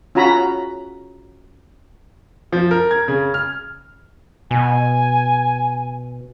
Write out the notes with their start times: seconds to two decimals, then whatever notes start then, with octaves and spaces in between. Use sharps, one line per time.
0.15 C#4 F4 F#4 A#5 B5
2.53 F3
2.71 A#4
2.91 G#6
3.08 C#3
3.34 F6
4.51 B2 G#5